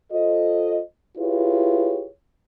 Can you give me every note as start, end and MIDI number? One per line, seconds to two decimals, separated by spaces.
0.12 0.79 65
0.12 0.79 69
0.12 0.79 72
0.12 0.79 75
1.18 2.06 64
1.18 2.06 65
1.18 2.06 67
1.18 2.06 68
1.18 2.06 71
1.18 2.06 73